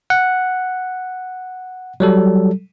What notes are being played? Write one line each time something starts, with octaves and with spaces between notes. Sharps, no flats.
F#5
F#3 G3 A4